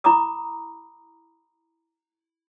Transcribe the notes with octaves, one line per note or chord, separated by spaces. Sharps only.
E4 A#5 B5 D6 D#6